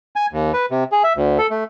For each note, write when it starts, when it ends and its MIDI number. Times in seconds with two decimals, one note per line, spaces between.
0.16 0.26 80
0.33 0.52 39
0.54 0.66 71
0.71 0.84 48
0.92 1.03 68
1.04 1.13 76
1.17 1.38 38
1.38 1.47 69
1.51 1.64 57